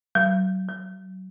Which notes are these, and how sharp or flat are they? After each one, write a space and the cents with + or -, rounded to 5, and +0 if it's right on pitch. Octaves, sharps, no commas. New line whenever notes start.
F#3 +25
F#3 +10